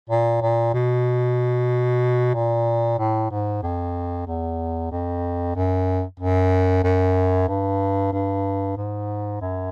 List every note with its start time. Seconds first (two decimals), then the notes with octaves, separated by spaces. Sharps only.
0.09 A#2
0.42 A#2
0.74 B2
2.34 A#2
2.99 A2
3.30 G#2
3.62 F2
4.27 E2
4.91 F2
5.56 F#2
6.20 F#2
6.84 F#2
7.48 G2
8.13 G2
8.77 G#2
9.41 F#2